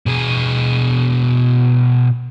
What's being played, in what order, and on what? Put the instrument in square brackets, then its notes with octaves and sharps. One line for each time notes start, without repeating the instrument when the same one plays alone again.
[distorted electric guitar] B2 G#4